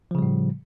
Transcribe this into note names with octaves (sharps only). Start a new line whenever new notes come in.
A2 C#3 F3 G3